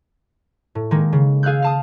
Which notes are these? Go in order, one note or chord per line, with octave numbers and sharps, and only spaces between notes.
A2
D#3 G#3 A#3
C#3
G#4 F5 E6 F#6 G6
F5 A5 D#6